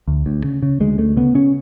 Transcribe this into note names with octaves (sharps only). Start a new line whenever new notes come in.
D2
D2
C#3
C#3
D2 G#3
D2 A3
C#3 B3
C#3 C#4